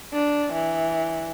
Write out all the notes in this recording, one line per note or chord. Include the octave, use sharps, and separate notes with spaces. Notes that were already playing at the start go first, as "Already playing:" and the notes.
D4
E3